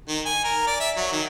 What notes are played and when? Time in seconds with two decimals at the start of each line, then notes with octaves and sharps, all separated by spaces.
0.08 D#3
0.26 G#5
0.44 A#4
0.67 D5
0.80 E5
0.97 F#3
1.12 D#3